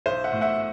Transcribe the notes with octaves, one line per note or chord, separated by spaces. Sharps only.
B1 C5
E5 F#5
A2
E5 F#5